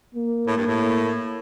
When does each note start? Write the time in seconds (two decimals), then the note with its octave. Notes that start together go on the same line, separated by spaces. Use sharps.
0.15 A#3
0.47 A2
0.57 G2
0.67 A2
0.81 A#3